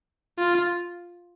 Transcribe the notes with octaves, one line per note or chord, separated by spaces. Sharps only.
F4